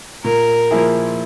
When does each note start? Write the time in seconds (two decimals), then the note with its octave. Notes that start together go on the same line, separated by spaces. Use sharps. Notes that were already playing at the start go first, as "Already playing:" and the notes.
0.24 A#2 A#4
0.71 F3 A#3 E4 G#4